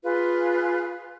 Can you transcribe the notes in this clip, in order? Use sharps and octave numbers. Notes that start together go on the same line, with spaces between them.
F4 G#4 B4